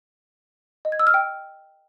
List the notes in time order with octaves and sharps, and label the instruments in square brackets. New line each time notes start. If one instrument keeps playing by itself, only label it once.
[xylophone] D#5
G#6
E6
F6
G5